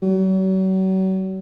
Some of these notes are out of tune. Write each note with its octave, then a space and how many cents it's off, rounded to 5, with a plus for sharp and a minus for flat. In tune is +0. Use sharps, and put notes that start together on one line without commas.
F#3 +40